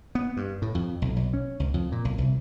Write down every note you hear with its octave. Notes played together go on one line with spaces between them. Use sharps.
B3
G2
A2
F2
B1
B1
C#4
C#2
F2
A#2
B1
C2